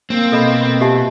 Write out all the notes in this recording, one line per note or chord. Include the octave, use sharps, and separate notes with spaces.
A#3 C4
B2 A4 D#5 B5
G4 E5 A5